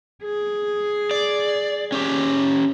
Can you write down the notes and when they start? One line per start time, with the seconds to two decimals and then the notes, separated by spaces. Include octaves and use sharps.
0.24 G#4
1.11 D5
1.92 C#4 G4